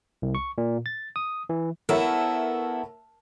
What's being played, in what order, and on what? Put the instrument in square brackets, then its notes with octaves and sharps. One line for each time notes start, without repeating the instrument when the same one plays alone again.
[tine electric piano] C2
C#6
A#2
A6
D#6
E3
[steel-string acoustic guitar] B3 E4 [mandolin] A4 [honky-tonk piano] A#4 C#5 E5